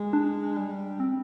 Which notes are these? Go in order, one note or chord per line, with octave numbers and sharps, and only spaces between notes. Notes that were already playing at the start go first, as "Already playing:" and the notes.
Already playing: G#3
D4
G3
C4